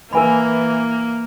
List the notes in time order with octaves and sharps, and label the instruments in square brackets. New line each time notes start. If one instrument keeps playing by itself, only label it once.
[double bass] E3 [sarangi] A#3 [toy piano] A#4 G#5 B5